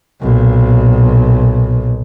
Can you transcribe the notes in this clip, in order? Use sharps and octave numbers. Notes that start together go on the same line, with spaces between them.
B1 A#2